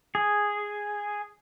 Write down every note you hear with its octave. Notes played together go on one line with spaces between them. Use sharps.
G#4